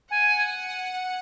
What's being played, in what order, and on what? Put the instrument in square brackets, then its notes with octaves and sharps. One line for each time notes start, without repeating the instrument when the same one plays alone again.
[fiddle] F#5 [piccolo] G#5